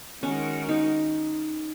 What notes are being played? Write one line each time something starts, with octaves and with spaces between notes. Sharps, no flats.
D#3 G#3 C#4 F#4 A#4
D#4